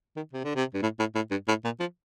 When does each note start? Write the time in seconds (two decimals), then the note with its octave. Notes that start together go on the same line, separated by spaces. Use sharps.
0.16 D#3
0.33 C3
0.44 D3
0.56 C3
0.74 G2
0.82 A2
0.99 A2
1.15 A2
1.31 G2
1.48 A2
1.65 A#2
1.80 F3